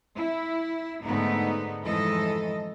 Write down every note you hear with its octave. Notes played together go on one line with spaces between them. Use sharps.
E4
G#2 D3 A3 B3 D#4
F2 G#2 E3 A4 D#5